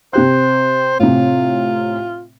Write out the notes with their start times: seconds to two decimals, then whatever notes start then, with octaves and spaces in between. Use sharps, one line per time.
0.13 C3 G4 C5 F#6
1.00 A2 C3 F4